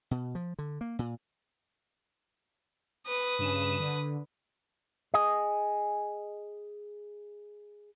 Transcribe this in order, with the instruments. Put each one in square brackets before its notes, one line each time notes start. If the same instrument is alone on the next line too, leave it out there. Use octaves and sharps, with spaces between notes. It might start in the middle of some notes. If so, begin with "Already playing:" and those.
[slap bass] B2
F3
D3
A#3
A#2
[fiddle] B4 D#6
[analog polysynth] G2 C#3 E7
D3
[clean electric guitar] G#4 D#5